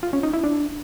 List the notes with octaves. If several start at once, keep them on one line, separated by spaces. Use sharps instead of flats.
F4
C#4
D#4
E4
D4